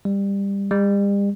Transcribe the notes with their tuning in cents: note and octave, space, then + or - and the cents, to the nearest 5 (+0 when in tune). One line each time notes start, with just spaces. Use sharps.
G3 +20
G3 +40